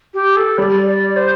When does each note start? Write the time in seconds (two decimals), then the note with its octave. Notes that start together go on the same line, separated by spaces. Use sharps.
0.14 G4
0.36 A4
0.58 G3 D5
0.86 D5
1.16 C5